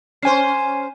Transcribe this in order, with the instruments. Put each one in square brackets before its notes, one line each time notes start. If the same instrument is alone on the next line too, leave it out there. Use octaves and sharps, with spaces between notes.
[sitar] C#4 C5 [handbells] G#5 C7